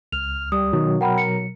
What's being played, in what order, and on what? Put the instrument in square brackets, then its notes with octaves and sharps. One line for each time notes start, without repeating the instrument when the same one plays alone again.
[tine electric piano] C#2 [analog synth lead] F6 [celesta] F7
[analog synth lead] G3 [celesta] D#6
[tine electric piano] B2 F#3 [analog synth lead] D#3
[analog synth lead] A#4 [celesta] F#5 G5 B5
[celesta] C#7